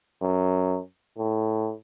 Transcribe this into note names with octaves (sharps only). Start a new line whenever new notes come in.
F#2
A2